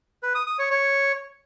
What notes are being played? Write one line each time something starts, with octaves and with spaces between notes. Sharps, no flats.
B4
D#6
D#6
C#5
C#5